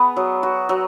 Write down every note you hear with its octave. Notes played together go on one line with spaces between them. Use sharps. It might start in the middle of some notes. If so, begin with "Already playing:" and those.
Already playing: B3 G#4 B4
F#3
F#4
F#3